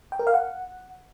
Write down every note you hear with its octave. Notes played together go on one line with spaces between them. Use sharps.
G5
A#4
F5
F#5